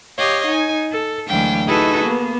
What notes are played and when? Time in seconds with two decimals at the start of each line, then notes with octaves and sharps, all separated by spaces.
0.17 G4 C#5 D#5 F5
0.47 D#4 G#5
0.90 A4
1.27 D2 E3 F#3 G#3 F5 G5
1.67 D#4 E4 F#4 G#4 A4 B4
2.03 A#3 B3